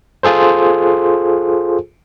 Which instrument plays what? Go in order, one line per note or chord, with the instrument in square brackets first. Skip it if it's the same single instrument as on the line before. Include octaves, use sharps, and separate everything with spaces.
[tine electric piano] F4 G#4 A4 C5